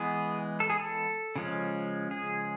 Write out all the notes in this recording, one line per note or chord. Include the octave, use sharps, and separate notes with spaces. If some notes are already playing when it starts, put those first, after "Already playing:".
Already playing: E3 G#3 B3 G#4
A4
G#4
A4
C#3 F3 G#3 C#4
G#4